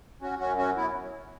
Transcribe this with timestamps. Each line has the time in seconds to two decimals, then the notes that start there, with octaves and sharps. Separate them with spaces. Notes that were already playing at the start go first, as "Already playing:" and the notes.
0.21 F#3 C#4 F#4
0.39 F#2 C#4 F#4
0.58 F#3 C#4 F#4
0.76 F#3 B3 E4